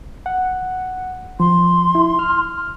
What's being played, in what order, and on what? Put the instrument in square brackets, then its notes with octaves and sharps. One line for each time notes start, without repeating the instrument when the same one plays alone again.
[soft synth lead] F#5
[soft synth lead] F3 [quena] C6
[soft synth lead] E4
F6